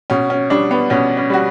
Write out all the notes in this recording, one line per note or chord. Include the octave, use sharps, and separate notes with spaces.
B2 C#4
C#4
G3 D4
B3
B2 C#4
C#4
G3 F#4